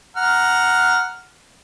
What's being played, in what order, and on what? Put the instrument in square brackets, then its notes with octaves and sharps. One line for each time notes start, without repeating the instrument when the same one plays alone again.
[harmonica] F#5 A#5 F6